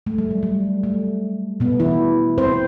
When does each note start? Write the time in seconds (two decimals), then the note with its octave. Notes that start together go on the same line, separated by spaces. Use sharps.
0.07 A3
0.18 G3
0.31 F#3
0.43 G3
0.83 A3
1.60 B2 B3
1.80 E3 E4
2.38 C4 C5